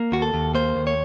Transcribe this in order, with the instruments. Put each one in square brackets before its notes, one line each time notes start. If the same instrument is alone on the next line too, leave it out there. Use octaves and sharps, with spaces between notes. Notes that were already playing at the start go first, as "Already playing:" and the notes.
Already playing: [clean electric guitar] A#3
D#2 F#4
A4
D#2
A#3 C5
D#2
C#5